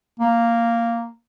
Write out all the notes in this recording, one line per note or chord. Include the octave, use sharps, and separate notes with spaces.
A#3